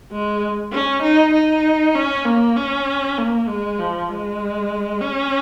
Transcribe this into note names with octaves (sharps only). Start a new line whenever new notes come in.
G#3
C#4
D#4
D#4
C#4
A#3
C#4
A#3
G#3
F3
G#3
C#4